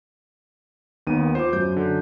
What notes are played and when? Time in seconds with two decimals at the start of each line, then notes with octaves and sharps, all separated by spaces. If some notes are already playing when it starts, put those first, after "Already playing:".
1.07 D#2 D#3 B3 D#7
1.35 F4 C5 D6
1.53 F#2 G6
1.77 D3